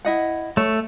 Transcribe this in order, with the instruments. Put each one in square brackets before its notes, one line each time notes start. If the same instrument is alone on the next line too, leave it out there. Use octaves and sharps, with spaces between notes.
[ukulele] E4 D#5 F#5
[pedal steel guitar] A3 [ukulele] C#5